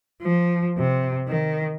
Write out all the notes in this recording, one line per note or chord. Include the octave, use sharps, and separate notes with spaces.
F3
C3
D#3